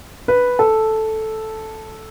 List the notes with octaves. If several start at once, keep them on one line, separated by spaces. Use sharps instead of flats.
B4
A4